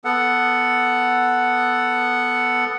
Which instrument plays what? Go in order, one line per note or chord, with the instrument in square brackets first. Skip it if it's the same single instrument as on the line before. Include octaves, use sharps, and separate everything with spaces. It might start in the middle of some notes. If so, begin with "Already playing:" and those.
[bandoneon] B3 A4 F#5